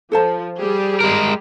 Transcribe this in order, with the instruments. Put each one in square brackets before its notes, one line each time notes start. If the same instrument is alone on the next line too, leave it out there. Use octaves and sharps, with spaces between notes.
[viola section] F3 [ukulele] A4 C5 A5
[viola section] G3 G4 G#4
[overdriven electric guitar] G#3 A#4